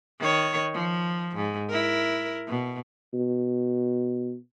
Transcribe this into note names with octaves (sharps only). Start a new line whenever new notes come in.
D#3 C#5
F3
G#2
E4 A#4
B2
B2